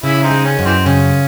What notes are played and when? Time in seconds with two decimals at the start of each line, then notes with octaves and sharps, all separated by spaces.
0.03 C#3 C#4 E4
0.23 C4 D#4
0.31 G#3
0.45 C#4
0.59 F#2
0.66 E3 C4
0.86 C#3 C#4